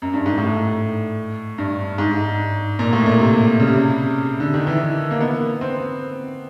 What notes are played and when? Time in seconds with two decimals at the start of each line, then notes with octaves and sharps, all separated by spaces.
0.02 F#2
0.14 G2
0.26 G#2
0.38 A2
1.58 G2
1.98 G#2
2.79 A#2
2.93 A2
3.06 A#2
3.20 C3
3.60 C#3
3.67 C3
3.76 C#3
4.40 D3
4.54 D#3
4.67 E3
5.11 A#3
5.21 B3
5.61 C4